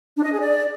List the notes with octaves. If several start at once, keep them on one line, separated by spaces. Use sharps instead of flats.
D4
D#5
G#4
D5